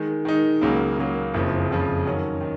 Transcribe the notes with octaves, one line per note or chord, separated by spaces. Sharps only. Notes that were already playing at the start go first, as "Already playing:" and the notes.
Already playing: D#3 G#3 D#4
D#3 G#3 D#4
C#2 C#3 F#3 A#3
C#2 C#3 F#3 A#3
F#1 F2 C#3 F3
F#1 F2 C#3 F3
D#3 F#3 C#4
D#3